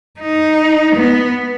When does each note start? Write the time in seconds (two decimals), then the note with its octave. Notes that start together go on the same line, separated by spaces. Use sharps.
0.20 D#4
0.95 B3